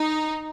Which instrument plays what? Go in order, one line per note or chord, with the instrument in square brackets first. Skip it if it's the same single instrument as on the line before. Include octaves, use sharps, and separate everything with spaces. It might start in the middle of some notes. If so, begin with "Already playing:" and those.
Already playing: [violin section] D#4